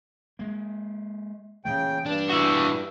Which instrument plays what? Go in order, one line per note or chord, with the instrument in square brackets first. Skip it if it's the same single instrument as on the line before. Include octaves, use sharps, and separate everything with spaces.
[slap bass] G#3 A#3
[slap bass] A#2 E3 A3 [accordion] C#3 G5
[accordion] G2 [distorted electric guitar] D4
[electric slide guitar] E4 F#4